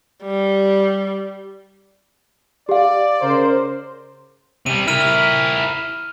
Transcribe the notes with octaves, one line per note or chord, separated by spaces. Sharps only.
G3
G4 D5 F5
C#3 A#4 C5
C3 G3 D#7
E4 A#4 F6 D#7